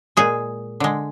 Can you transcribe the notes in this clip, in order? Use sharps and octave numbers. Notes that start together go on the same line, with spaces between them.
A#2 G#3 G#4
D3 G#3